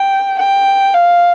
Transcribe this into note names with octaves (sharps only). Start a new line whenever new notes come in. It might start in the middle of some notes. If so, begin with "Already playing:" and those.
Already playing: G5
G5
F5